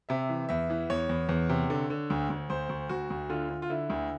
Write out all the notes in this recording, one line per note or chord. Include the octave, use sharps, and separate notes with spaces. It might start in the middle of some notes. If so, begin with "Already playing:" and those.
C3 E5
E3
E2 E5
E3
E2 C#5
E2
E2
C3
D3
D3
D2
D2
D2 C5
D2
D2 F#4
D2
D3 F4
D3
F4
D3 E4
D2